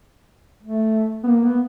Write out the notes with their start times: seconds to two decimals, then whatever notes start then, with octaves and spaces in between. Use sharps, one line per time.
0.63 A3
1.24 B3
1.28 A#3
1.44 B3